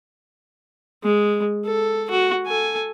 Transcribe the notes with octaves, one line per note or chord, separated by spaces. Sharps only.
G#3
A4
F#4
A4 G#5